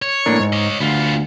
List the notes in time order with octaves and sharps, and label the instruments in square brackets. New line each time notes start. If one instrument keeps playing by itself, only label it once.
[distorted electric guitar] C#5
[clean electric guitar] A2 A#3 D4
G#2
[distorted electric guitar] C#5 D#5
[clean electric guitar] D2 [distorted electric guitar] B3 F4